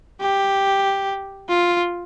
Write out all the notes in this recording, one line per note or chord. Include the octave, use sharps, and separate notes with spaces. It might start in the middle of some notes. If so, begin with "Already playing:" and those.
G4
F4